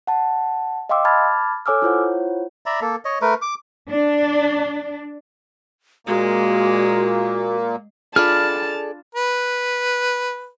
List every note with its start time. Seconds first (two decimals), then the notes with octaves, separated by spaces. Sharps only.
0.07 F#5 A5
0.89 D#5 F5 G5 C6 D6 E6
1.05 A5 B5 D6 F6 G#6 A6
1.66 A4 C#5 G#5 D6 E6 F6
1.82 E4 F4 C5 C#5 F#5
2.66 D5 E5 A#5 B5
2.81 A#3 A4
3.05 C#5 D#5
3.22 A3 A#4 B4
3.42 D6
3.89 D4
6.07 A#2 G#3 A#3 F#4
8.16 D4 F4 G#4 A4 D5 A5 B5 F6
9.15 B4